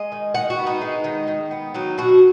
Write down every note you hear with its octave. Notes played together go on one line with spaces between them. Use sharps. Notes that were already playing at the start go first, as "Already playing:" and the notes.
Already playing: G#3 D#5
D#3
D#3 F#5
F#4
B3
D#4
G#3
D#3
D#3
B3
F#3 D#4
B2 F#4